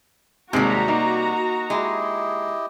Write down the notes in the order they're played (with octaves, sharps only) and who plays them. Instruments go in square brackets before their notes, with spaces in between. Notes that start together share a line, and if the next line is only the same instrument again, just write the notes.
[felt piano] D#2 G#3 [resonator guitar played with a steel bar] C3 G3 [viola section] F#4 A#5
[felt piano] A#3 D#4
[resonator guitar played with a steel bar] G#3 [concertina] E4 G4 D#5